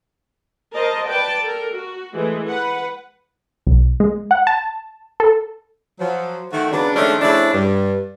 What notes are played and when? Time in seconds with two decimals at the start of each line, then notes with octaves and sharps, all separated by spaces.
0.74 A#4 C5 D#5 A5
1.08 B4 D5 G5 A5
1.42 A4 A#4
1.73 F#4
2.15 E3 G#3 A3
2.47 B4 F#5
3.67 B1
4.00 G#3
4.31 F#5
4.47 A5
5.20 A4
6.00 F3 F#3
6.53 D#3 A3 F#4
6.72 C#3 F#3 B3 D4
6.95 D#3 F3 G#3 A3 C#4 D4
7.22 C#3 F3 A3 D4 E4
7.54 G2